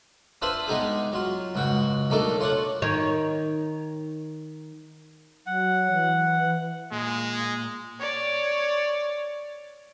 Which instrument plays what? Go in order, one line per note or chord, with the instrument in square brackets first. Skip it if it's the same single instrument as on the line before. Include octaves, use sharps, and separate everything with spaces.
[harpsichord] D4 F4 B4 C5 E5 B5
G#3 B3 D#4 G4 G#4
F#3 F4
C#2 G#2 F#4 G5
B1 A3 A#3 D4 D#4 A4
F4 C#5 D5 F#5
[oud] D#3 C#5
[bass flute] F#3 [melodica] F#5
[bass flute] E3
[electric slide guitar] A#2 [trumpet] G#3
[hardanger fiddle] C#5 D5